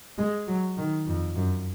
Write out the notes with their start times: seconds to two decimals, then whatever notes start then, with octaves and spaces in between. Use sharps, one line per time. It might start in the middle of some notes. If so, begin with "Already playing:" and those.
0.18 G#3
0.47 F#3
0.77 D#3
1.07 F2
1.35 F#2